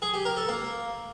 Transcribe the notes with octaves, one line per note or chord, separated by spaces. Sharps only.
G#4
G4
A#4
A4
A#3